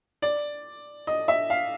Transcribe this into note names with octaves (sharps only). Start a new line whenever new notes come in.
D5
D#5
E5
F5